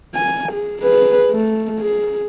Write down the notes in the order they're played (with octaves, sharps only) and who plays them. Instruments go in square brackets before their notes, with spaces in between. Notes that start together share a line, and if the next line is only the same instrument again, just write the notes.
[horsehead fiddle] G#5
G#4
G#4 B4
A3
G#4